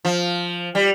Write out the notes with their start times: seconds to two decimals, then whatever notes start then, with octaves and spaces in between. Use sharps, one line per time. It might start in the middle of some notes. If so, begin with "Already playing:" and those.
0.05 F3
0.75 G3